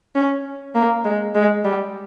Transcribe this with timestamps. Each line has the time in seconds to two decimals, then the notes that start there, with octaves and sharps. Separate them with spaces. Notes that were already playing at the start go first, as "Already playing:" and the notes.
0.15 C#4
0.75 A#3
1.04 G#3
1.35 G#3
1.65 G3